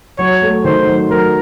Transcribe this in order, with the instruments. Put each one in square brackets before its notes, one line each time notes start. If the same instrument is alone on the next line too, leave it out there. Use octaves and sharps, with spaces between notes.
[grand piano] F#3 [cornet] C#5
[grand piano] A3
[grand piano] D#3 [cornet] C5
[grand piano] F#3
[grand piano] F#3 [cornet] A#4